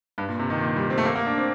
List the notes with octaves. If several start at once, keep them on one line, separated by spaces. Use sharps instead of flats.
G2
A#2
C3
D#3
A#2
G3
C4
A3
A#3
A#3
D4
C4